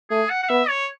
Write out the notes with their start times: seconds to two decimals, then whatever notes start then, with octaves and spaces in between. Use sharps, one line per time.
0.10 A3 G#4
0.30 F#5
0.43 F#5
0.49 B3 E5
0.69 C#5